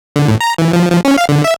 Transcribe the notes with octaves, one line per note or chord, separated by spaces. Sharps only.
D3
A2
A#5
E3
F3
F3
C#4
F5
D3
E5